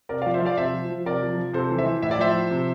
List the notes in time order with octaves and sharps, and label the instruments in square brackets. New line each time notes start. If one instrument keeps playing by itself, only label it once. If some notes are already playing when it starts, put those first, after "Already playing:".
[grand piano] C3 A#4 D5
D5 F5
F3
C5 E5
F3 D5 F5
C3 C5 E5
F3
F3
C3 A#4 D5
F3
F3
C3 A4 C5
E3
C5 E5
E3
A2 E5
D5
F3 C5 E5
F3
C3